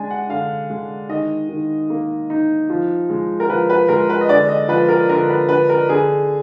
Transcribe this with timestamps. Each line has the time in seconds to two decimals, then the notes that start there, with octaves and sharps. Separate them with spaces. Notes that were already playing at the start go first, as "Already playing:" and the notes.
Already playing: G#3 D4 G#5
0.10 F#5
0.29 D3 F5
0.70 G#3
1.09 D#3 D#5
1.49 D#3
1.90 A#3
2.30 D#4
2.70 F3
3.10 G#3
3.40 A#4
3.50 F3 B4
3.70 B4
3.88 G#3 A#4
4.10 B4
4.21 D#5
4.29 D3 D5
4.49 D#5
4.68 F3 B4
4.88 A#4
5.09 D3 A#4
5.29 B4
5.49 D3 B4
5.69 A#4
5.89 D3 G#4